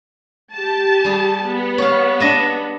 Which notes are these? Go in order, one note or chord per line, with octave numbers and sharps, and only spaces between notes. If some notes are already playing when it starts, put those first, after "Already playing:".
G4 A5
G3 G#4
B3
C#5 F5
D4 D#5 E5